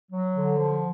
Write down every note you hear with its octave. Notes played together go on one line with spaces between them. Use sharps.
F#3
D3
F3